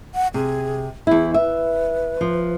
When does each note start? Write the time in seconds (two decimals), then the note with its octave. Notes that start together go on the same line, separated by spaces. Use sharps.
0.15 F#5
0.34 C3 G#4
1.07 E2 E4 G#4
1.34 B4 E5
2.21 F3